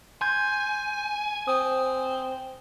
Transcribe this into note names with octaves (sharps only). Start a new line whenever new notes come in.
G#5 C6 G6 G#6
C4 D#6